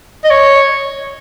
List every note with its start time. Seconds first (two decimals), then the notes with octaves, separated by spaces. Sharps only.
0.24 D#5
0.30 C#5